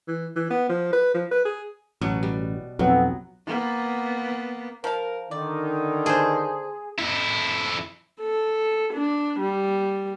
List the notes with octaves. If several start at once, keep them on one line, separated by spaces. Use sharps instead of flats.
E3
E3
B3
F3
B4
F3
B4
G#4
A1 B2 F#3 B3
G3
B1 F2 F#3 B3 C4
A#3 B3
F3 A#4 F5
D3 D#3 D#4 D5
D4 G#4 C5
F2 E4
A4
D4
G3